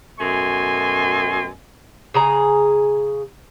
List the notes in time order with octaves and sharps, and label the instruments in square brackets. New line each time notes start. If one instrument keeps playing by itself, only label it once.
[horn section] F#2 B2 A3 G#5 C6
[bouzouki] C#3 G#4 A#5